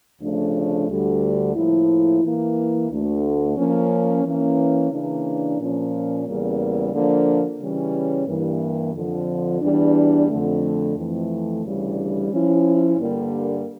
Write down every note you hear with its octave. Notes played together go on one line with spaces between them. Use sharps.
D2 C#3 F3 A3 D4
D2 D3 G3
A2 F3 A#3 E4
E3 A#3 E4
D2 D3 A3
F3 A#3 C#4
E3 A#3 C#4
C#3 E3 A#3 D4
A#2 F3 A#3 C#4
E2 C#3 G3 A#3
D3 F3 A#3 D4
C#3 E3 G3 C#4
G2 E3 A#3
F2 D3 F3
E2 E3 G3 D4
F2 D3 A3
F2 E3 A3
D2 C#3 E3 G3 D4
F3 C#4 E4
G2 D3 G3 A#3